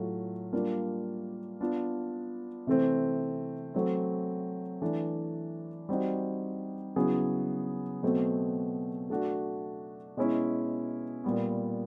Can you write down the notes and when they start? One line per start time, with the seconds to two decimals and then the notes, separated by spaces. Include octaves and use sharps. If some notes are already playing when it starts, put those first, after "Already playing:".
Already playing: A2 F#3 A3 F4
0.53 G3 A#3 D4 F4
1.60 B3 D4 F4
2.67 C3 E3 A3 C4
3.74 F#3 A3 C4
4.82 E3 A3 D4
5.89 G3 C4 D#4 F#4
6.96 C#3 F#3 B3 E4 G#4
8.03 B2 F#3 A3 C4
9.10 A3 D4 F#4
10.17 B2 G#3 C#4 E4
11.24 A#2 G3 B3